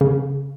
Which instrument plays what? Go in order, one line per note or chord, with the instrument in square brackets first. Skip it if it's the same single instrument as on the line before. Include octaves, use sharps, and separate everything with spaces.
[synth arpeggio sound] C#3